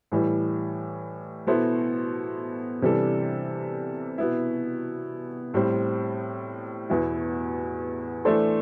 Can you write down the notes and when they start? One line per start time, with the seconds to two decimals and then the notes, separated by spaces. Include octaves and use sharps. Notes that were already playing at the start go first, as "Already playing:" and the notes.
0.12 A2 E3 G3
1.47 B2 B3 E4 A4 C5
2.82 C3 E3 G3 D4 A4
4.18 B2 B3 E4
5.54 A2 G3 C4
6.90 E2 B2 B3 E4
8.25 E3 A3 D4 A4 C5